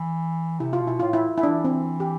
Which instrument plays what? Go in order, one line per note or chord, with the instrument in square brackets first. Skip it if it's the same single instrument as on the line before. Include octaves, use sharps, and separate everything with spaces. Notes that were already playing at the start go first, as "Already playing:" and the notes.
Already playing: [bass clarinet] E3
[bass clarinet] C3 [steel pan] E4
[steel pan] F4
[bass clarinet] B2
[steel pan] E4
[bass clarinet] A2 [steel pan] F4
[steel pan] E4
E4
[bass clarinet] E3 [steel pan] D4
[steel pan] C4
G4